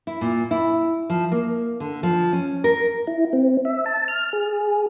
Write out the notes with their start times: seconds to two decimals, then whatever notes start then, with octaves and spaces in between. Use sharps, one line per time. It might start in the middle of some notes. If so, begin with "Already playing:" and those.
0.07 E4
0.21 A#2
0.51 E4
1.10 F3
1.32 A#3
1.80 D3
2.03 F3
2.33 C#4
2.64 A#4
3.07 E4
3.33 C4
3.65 E5
3.86 A5
4.08 F6
4.33 G#4